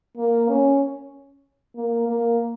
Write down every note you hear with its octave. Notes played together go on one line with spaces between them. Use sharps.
A#3
C#4
A#3
A#3